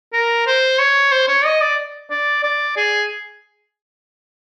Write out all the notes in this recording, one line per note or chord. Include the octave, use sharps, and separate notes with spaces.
A#4
C5
C#5
C5
C#5
D#5
D5
D5
D5
G#4